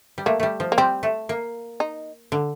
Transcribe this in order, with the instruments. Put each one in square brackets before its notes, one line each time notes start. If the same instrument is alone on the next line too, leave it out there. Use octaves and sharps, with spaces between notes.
[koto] G3
[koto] A3 [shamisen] A#3
[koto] G3 A3
F3
[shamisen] A#3
[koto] G3 [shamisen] C4
[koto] A3
A#3
[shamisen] D#4
[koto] D3